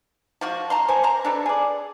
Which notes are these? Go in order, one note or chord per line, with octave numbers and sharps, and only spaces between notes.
F3 F4 F#4
A5 A#5 C6
C5 G#5
C5 A#5
D4 A4 B4
G#4 D5